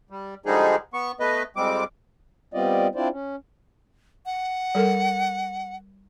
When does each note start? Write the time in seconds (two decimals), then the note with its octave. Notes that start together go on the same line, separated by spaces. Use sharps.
0.10 G3
0.46 D3 F3 G3 G#3 D#4 G#4
0.94 B3 C#6
1.20 A3 B3 B4 D#5
1.56 F2 G3 G#3 C4 D6
2.54 G3 B3 C4 F4 D5 D#5
2.95 C4 D4 E4 F4 C5 D5
3.11 C#4
4.26 F#5
4.75 G3 A4 A#4